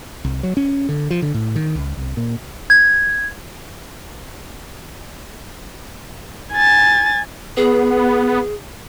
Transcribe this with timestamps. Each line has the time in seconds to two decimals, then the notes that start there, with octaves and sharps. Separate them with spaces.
0.25 C2
0.43 F#3
0.57 C#4
0.89 D3
1.10 F3
1.22 D3
1.34 A2
1.55 D#3
1.76 C#2
1.97 C2
2.17 A#2
2.70 G#6
6.53 G#5 A6
7.57 B3 G#4